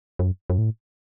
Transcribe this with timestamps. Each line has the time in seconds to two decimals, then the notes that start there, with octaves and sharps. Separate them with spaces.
0.19 F#2
0.50 F#2
0.58 A2